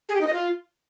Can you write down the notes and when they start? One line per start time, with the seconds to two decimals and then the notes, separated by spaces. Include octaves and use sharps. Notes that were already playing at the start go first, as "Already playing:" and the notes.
0.09 G#4
0.15 G4
0.21 D#4
0.27 D#5
0.33 F4